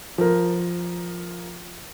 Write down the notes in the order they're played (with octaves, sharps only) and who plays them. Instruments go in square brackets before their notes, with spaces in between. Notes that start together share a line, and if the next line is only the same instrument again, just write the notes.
[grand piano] F3 A#4